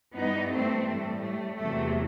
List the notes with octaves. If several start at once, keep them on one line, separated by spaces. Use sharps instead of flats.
G2 E3 G3 B3 D#4
A3 C4
A2 G3 A3
A3
E2 C3 F#3 A3